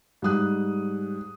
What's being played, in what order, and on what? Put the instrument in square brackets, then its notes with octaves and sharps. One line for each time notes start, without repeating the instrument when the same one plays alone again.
[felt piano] G#2 G3 D#6 F#6